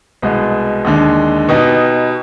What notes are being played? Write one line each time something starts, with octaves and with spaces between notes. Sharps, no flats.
C2 B2 G#3
D#2 D3 G#3
B2 B3 D#4 G4